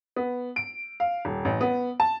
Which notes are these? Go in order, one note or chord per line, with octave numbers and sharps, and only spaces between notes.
B3
D7
F5
D#1
A1
B3
A5